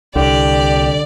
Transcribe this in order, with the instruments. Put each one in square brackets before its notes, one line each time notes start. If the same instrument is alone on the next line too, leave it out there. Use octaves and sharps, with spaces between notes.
[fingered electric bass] C2 [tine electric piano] D3 [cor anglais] G4 [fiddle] D5